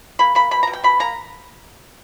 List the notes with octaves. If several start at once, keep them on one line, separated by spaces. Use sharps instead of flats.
A#3 B5
A#3 B5
B2 B5
B2 A#5
G5
B2 B5
A#3 A#5